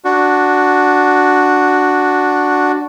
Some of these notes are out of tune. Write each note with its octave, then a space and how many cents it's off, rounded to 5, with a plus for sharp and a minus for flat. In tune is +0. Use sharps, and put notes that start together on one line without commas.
D4 +0 F#4 +0